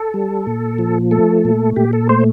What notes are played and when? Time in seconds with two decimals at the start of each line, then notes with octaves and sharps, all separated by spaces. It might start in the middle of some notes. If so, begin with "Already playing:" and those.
Already playing: A4
0.14 G3
0.47 A#2
0.79 F3
1.11 A3 A4
1.45 A#2
1.76 A#2 G4
1.93 A4
2.09 A3 C5